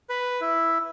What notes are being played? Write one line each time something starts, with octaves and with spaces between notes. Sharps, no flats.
B4
E4